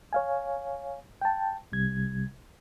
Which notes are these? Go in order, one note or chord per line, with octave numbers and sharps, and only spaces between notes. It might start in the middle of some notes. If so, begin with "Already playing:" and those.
C#5 F5 G#5
G5 A5
C2 C3 G3 G#6